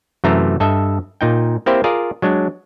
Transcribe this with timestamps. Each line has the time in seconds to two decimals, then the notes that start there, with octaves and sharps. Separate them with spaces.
0.24 F#2 C3 E3 A3 C5 A#5
0.60 G2 A4 D#5 E5
1.21 A#2 D#4 G5
1.66 A#3 C4 E4 G4 C5
1.84 F4 G#4 A#4 D5
2.22 F#3 G#3 D4